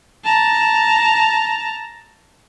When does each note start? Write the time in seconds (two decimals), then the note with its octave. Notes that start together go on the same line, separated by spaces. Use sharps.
0.24 A5 A#5